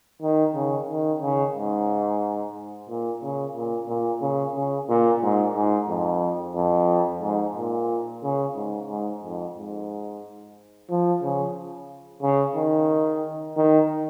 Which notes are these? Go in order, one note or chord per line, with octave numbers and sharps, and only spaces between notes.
D#3
C#3
D#3
C#3
G#2
A#2
C#3
A#2
A#2
C#3
C#3
A#2
G#2
G#2
F2
F2
G#2
A#2
C#3
G#2
G#2
F2
G#2
F3
C#3
C#3
D#3
D#3